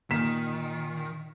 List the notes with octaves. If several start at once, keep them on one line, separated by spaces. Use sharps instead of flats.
A#2 D#3 B6 E7